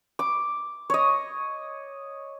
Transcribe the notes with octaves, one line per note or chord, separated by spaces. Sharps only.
D6
C#5 D#5